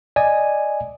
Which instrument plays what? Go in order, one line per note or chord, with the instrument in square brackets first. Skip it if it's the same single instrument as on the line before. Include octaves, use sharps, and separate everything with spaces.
[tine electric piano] D5 D#5 G#5